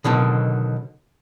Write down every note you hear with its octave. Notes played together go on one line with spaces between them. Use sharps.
B2 D3 D#3 F#3